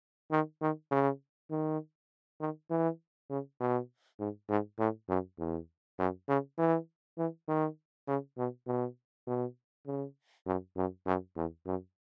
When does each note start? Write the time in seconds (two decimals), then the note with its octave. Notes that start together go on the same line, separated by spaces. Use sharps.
0.31 D#3
0.62 D#3
0.91 C#3
1.51 D#3
2.40 D#3
2.70 E3
3.30 C#3
3.60 B2
4.19 G#2
4.49 G#2
4.79 A2
5.09 F#2
5.39 E2
5.99 F#2
6.29 C#3
6.58 E3
7.18 E3
7.48 D#3
8.08 C#3
8.38 B2
8.67 B2
9.27 B2
9.87 C#3
10.47 F#2
10.76 F#2
11.06 F#2
11.36 E2
11.66 F#2